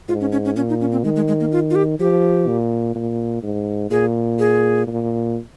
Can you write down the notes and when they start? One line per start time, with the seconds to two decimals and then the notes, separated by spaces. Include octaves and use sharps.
0.08 G#2 F4
0.21 C#4
0.32 C#4
0.45 C#4
0.56 A#2 C#4
0.69 D#4
0.80 C#4
0.92 C4
1.04 D#3 G#3
1.16 G#3
1.28 G#3
1.40 A#3
1.52 F4
1.70 F4
1.75 G4
2.00 F3 G4
2.48 A#2
2.95 A#2
3.43 G#2
3.91 A#2 G#4
4.39 G#4
4.87 A#2